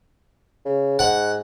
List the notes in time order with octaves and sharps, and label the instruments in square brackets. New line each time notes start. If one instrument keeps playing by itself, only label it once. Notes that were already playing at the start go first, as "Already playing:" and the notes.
[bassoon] C#3
[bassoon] G#2 [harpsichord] F#5